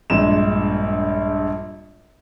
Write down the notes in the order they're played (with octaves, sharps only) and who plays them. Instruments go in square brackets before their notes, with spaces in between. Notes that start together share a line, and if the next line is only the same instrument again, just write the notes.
[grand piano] A#1 G2 G#3 E7